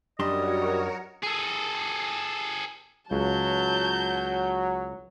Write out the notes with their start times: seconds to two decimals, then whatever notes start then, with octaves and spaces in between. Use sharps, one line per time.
0.19 F#2 G3 D4 F#4 A#4 C#5 D#5 C6
1.24 G#4 A4
3.11 C#2 F#3 A5 G6